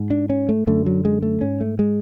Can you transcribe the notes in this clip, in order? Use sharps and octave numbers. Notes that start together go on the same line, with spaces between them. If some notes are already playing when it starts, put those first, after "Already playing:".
Already playing: G#2
D4
C#4
A3
F#2 D3 A3
F#3
G#3
A3
G#2 C#4
A3
G#3